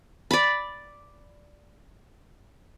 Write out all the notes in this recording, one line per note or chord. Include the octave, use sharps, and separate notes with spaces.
D5 B5